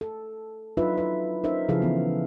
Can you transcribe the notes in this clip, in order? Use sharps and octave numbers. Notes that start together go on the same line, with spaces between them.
A4
F#3 D4 D#4 F4 B4 E5
E4 B4
C#4 D#4 A#4 C5 E5
C#3 F3 E4 G#4 A4 F5
E3 B3